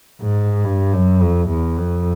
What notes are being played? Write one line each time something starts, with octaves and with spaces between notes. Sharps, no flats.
G#2
G2
F#2
F2
E2
F2